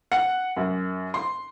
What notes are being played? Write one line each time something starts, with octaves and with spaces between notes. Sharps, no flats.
F#5
F#2
C6